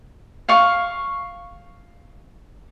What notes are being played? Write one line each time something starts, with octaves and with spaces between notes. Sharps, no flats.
F5 C#6